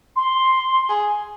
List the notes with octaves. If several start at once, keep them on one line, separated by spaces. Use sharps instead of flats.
C6
G#4